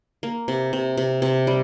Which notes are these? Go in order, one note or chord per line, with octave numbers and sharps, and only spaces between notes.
A#3
C3
C3
C3
C3
G3